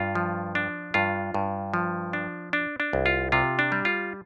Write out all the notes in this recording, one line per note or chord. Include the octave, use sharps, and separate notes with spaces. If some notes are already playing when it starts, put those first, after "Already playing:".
Already playing: G2 F4
F3
D4
G2 F4
G2
F3
D4
D4
D4
C2
F4
C3 F4
D4
G3
F4